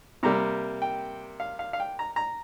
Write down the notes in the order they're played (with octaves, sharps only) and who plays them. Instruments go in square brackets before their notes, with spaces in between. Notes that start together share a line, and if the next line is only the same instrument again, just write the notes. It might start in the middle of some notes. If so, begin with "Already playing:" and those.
[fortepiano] C3 G3 A#3 A#5
G5
F5
F5
F5
G5
A#5
A#5